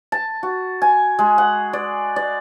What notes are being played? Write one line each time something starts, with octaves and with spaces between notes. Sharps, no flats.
A5
F#4
G#5
G#3
F#5
D5
D5